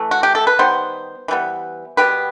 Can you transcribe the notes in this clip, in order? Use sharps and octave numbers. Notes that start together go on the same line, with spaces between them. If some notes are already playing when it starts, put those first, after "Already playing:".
Already playing: E3 A3
F#4
G4
A4
B4
D#3 G3 B3 C5
E3 G3 B3
B2 G3 B3 G4 B4